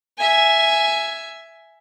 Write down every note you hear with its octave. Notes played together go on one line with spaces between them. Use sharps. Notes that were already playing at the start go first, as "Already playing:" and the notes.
E5 G#5